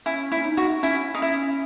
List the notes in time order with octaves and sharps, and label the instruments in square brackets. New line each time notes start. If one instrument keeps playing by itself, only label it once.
[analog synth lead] C#4 [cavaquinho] E4
[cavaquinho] E4
[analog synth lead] C#4
D#4
[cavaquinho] F#4
[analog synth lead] C#4 [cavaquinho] E4
[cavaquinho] D#4
E4